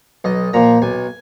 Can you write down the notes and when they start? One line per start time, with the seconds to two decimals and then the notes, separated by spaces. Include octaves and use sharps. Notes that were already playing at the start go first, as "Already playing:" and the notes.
0.24 B1 D#5
0.53 A#2 F3 A#5
0.82 B1 G#5